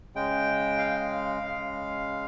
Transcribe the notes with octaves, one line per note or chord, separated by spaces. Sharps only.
C#3 G#3 G5
F5
C#3 G#3